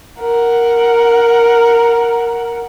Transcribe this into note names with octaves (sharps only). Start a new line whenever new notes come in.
A#4 F#5